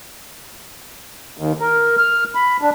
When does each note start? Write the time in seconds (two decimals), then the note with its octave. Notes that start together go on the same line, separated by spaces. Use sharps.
1.38 D#2
1.60 A#4
1.98 F6
2.35 B5
2.62 D4